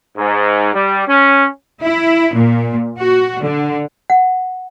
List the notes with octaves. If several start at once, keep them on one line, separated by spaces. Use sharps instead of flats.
G#2
G3
C#4
E4
A#2
F#4
D3
F#5